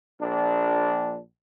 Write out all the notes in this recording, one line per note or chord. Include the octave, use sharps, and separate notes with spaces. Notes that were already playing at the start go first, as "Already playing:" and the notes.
A#1 D4